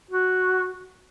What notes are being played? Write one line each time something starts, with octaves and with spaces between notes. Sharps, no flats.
F#4